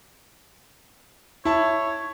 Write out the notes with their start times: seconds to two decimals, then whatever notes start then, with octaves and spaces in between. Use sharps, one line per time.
1.45 E4 C#5 A5